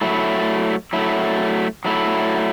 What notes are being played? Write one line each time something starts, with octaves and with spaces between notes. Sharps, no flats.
F#3 A3 E4
F#3 A3 E4
F#3 A3 E4